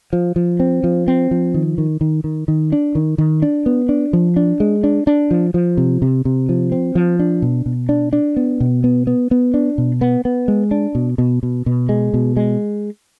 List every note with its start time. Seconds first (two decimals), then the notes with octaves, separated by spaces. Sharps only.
0.13 F3
0.36 F3
0.60 C4
0.84 F3
1.08 C4
1.31 F3
1.54 D#3
1.78 D#3
2.01 D#3
2.24 D#3
2.48 D#3
2.72 D4
2.95 D#3
3.18 D#3
3.42 D4
3.66 B3
3.89 D4
4.13 F3
4.36 D4
4.60 G#3
4.84 D4
5.07 D4
5.31 F3
5.54 F3
5.77 C3
6.02 C3
6.25 C3
6.49 F3
6.72 C4
6.95 F3
7.19 D4
7.42 B2
7.66 B2
7.89 D4
8.13 D4
8.36 B3
8.60 B2
8.84 B3
9.07 B3
9.31 B3
9.54 D4
9.78 B2
10.01 B3
10.25 B3
10.48 G#3
10.71 D4
10.95 B2
11.18 B2
11.43 B2
11.66 B2
11.89 G#3
12.14 B2
12.37 G#3